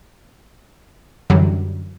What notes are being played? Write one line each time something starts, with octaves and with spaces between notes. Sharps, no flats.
F#2 D3 E3 F#3 G3